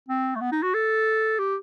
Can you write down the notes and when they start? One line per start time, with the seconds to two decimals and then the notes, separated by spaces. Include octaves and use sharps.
0.09 C4
0.36 A3
0.41 B3
0.52 D#4
0.63 F#4
0.74 A4
1.39 G4